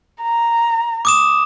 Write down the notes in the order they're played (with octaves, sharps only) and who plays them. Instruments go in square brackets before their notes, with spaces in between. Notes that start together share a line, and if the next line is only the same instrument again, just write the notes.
[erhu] A#5
[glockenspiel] D6 D#6 E7